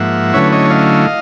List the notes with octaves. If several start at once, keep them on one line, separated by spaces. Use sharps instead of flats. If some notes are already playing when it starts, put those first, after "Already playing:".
Already playing: G#2 F3 A#3 E5 F#5
D3 F#3 A3 C#4 E4 B4 C#5
C#5 D#5
D#5 F5